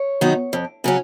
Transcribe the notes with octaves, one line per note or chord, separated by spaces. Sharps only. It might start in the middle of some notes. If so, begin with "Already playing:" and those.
Already playing: C#5
D#3 F#3 B3 D#4
F2
C#3 F#3 C#4